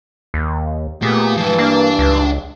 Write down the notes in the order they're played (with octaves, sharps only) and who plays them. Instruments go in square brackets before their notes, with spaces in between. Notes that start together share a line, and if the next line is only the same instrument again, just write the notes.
[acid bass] D#2
[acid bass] A#2 [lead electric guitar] A3 [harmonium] B3 G4 G#4
[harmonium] G2 E3 A5 [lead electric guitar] F3 G#3
[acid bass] A#3 [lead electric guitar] D4
[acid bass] C#2